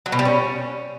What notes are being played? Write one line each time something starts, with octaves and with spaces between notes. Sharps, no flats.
F#3
B2
G3
C#4